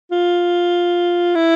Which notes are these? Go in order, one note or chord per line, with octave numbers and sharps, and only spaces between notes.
F4
E4